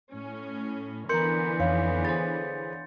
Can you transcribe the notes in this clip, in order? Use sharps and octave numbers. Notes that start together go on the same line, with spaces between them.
A2 C#4
D3 E3 B3 A#4 A#5 C6 G6 C#7
F2 D#4 C#5 F5
G#4 C5 A6